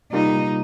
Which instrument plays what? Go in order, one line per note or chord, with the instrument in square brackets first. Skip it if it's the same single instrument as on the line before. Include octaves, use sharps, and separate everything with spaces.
[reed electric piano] C3 G3 A#3 F4 [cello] D#4